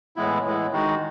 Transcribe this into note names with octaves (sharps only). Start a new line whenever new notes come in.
A2 E3 G#3 B3 E4
A2 E3 G#3 B3 E4
D#3 G#3 D#4 F#4